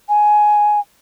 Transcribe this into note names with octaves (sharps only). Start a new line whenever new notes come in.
G#5